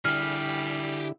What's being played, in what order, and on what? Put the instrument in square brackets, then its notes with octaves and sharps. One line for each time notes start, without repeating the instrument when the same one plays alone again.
[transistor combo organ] D3 E4 [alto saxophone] G3 [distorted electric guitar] G4 G#4 [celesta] F6